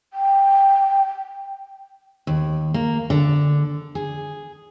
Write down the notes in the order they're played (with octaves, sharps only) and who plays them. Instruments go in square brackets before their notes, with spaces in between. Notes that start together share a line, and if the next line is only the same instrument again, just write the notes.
[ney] G5
[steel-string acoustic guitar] D#2
A#3
D3
G#4